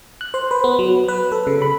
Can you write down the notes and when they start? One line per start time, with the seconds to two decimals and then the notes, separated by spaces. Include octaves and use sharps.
0.21 F#6
0.34 C5
0.51 B4
0.64 B3
0.79 F#3
1.08 B4
1.32 A4
1.47 C#3
1.62 B5